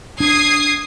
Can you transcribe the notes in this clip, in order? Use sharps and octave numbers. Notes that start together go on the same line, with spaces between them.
D4 D#6 G#6 C7